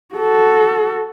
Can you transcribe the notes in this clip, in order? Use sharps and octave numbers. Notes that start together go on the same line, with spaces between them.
F#4 A4